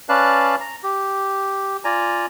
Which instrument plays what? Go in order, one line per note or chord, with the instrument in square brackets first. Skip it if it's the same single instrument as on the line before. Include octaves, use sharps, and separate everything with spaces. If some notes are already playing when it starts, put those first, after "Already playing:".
[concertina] C#4 B4 D5 F5 A5 F#6
A#5
G4
F4 D5 G#5 A#5